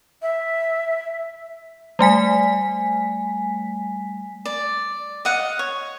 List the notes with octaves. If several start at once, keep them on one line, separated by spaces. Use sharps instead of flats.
E5
G3 A3 G#5 B6
D5
D#5 F5 F#5
C#5